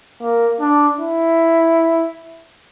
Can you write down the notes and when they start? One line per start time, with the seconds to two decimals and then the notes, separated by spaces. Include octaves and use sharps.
0.22 A#3
0.60 D4
0.99 E4